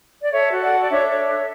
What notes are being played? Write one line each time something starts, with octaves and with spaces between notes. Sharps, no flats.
D5
A4 C#5 E5
F#4
D5 F#5
A4
D5
D4 C#5 E5
C#5
A4